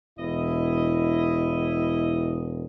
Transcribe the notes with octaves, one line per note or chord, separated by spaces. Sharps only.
E1 E4 D#5